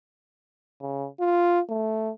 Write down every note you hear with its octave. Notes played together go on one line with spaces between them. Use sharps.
C#3
F4
A3